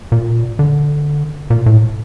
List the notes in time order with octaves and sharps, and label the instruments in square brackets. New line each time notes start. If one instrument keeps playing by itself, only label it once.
[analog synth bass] A#2
D3
A#2
A2